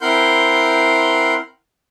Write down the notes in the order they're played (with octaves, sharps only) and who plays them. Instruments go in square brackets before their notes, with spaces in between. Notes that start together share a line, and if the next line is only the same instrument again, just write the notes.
[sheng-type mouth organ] C4 E4 A#4 F#5 C6 G6